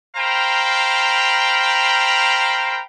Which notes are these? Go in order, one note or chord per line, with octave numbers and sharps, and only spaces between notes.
A#4 C5 F5 G5 A#5 B5